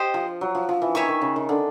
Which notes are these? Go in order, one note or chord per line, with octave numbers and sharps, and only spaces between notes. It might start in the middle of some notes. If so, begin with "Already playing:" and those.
Already playing: G4 C5 D#5
F3
F#3
F3
F3
E3
D#3 C#5 E5 G#5 C#6
D#3
C#3
D#3
D3